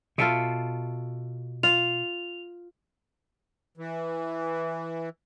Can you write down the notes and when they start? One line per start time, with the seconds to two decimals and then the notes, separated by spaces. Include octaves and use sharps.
0.18 B2 F4 A4 E5
1.63 F4 F7
3.77 E3